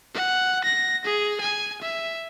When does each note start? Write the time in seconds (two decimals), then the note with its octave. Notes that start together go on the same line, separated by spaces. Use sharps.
0.14 F#5
0.64 A#6
1.05 G#4
1.41 G#5
1.81 E5